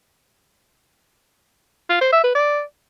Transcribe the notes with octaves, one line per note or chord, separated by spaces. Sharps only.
F4
C5
E5
B4
D5